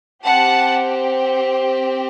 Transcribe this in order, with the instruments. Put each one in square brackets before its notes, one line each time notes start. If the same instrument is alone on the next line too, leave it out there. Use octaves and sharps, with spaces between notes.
[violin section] C4 G4 F#5 A5